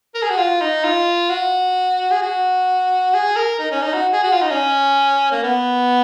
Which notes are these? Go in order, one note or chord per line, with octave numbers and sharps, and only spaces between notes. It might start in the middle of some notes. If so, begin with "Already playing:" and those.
A#4
G#4
F#4
F4
D#4
F4
F#4
G#4
F#4
G#4
A#4
D#4
C#4
D#4
F#4
G#4
F#4
F4
D#4
C#4
A#3
B3